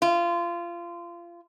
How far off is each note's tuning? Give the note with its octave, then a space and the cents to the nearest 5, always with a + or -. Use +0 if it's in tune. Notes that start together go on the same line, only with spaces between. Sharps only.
F4 -25